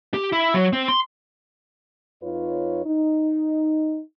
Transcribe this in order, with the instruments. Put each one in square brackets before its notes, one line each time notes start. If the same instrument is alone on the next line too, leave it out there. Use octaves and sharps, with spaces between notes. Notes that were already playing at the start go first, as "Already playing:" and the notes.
[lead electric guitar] G4
E4
F#3
C4
C6
[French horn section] F2 D#4 F4 B4 C#5
D#4